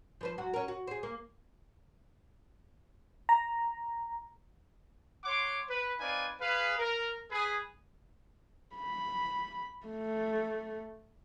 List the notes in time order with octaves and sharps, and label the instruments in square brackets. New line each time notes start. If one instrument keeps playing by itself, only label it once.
[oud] F3 B4 C5
F#3 F#4
C#4 A#4
F#4
G#4 C5
A#3
[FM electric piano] A#5
[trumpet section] C#5 F#5 C6 D6
B4
C4 D#4 B4 D5 F5 G#5
G#4 B4 F5
A#4
G#4 B4
[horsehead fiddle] B5
A3